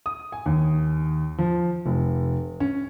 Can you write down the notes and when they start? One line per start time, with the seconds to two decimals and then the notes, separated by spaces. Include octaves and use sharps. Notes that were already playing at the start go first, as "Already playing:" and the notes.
0.06 D#6
0.32 G#5
0.46 D#2
1.38 F3
1.86 F1
2.60 C#4